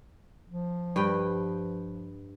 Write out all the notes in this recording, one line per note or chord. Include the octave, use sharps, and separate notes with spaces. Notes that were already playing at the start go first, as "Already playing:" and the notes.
F3
G2 B4 G5